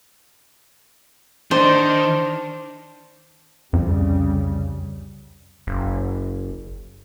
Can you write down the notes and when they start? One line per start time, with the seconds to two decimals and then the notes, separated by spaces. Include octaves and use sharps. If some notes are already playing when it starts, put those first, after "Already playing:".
1.51 D#3 D4 C5
3.73 C2 F2 C#3 G3
5.67 F#1